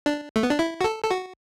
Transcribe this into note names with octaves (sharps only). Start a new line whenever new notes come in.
D4
A3
B3
D4
E4
F#4
A4
A4
F#4